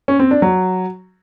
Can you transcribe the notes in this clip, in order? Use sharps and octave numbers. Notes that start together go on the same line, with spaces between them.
C#4
C4
D4
F#3